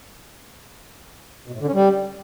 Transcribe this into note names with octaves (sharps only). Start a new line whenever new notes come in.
B2
A2
D3
C#4
G3